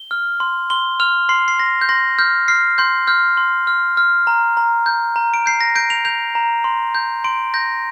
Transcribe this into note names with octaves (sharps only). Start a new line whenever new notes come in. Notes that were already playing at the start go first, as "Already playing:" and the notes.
Already playing: G7
F6
C6
C6 G7
F6 F7
C6 C7
C7
C6 A#6
G6
C6 A#6
F6 G6
F6 C7
C6 G6
F6 G6
C6
F6
F6
A#5
A#5
G6
A#5
D7
G6 C7
A#6
G6 D7
F7
G6 F7
A#5
C6
G6
C6 D7
G6 A#6